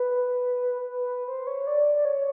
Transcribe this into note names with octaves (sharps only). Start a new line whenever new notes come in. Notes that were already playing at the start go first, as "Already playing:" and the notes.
Already playing: B4
B4
C5
C#5
D5
D5
C#5